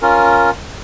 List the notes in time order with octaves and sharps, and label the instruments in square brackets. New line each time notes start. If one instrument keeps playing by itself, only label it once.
[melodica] C#4 F4 A#4